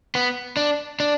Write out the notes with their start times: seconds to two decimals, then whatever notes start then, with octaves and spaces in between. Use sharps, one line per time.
0.15 B3
0.57 D4
1.00 D4